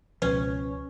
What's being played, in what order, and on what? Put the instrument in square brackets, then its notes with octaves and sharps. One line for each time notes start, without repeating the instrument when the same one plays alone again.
[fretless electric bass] C#2 B2 F3 [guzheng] C#4 [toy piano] B4